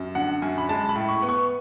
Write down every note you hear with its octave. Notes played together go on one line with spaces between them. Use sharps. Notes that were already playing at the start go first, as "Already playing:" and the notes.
Already playing: F#2
D3 F#5
F#2 G#5
B5
G#3 A5
B5
A2
C#6
B3
C#6